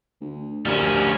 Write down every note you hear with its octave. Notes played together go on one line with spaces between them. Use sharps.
D2
D2 F3 G3 C#4 A#4